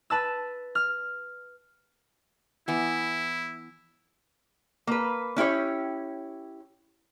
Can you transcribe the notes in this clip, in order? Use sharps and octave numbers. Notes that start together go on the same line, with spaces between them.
B4 A5 E6
F6
E3 B3 E4
A#3 B4
C#4 E4 G4 C#5